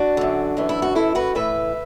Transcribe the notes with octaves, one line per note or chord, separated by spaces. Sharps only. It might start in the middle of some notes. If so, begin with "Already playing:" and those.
Already playing: D4 F#4
F#2 D3
F#2 E3
E4
F#4
F#2 E3 E4 A4
F#4 B4
A2 E3 B4 E5